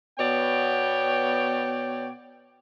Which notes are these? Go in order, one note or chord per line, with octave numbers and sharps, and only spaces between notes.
B2 B3 C#5 D5 G5